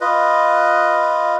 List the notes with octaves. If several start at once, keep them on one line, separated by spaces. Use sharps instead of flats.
F4 B4 D#5